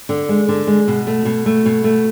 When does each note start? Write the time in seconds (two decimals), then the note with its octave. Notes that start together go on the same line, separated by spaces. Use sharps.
0.09 D3
0.29 G#3
0.48 D3
0.67 G#3
0.88 B2
1.07 A3
1.25 B2
1.46 A3
1.65 B2
1.84 A3